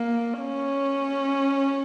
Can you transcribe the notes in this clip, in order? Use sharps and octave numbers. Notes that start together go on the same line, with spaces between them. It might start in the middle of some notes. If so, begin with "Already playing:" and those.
Already playing: A#3
C#4